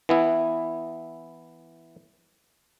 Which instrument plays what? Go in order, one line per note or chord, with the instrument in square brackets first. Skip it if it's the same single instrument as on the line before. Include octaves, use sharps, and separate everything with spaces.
[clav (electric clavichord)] E3 B3 E4